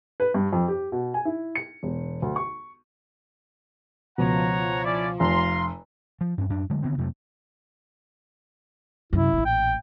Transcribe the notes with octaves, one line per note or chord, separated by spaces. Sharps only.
B4
G2
F2
G4
B2
G#5
E4
C#7
E1
D2
C#6
C#2 B2 F3 C#5 F#5 A#5
C#4 E4 D5
F1 F2 F4 A#5 C6
F3
G2 C4 C#4
F#2 D4
D3 F#3 G#3 A3
D3 D#3 B3 C4
F2 C3 F#3 A3
F#2 C3 E4
A1 A#2
G5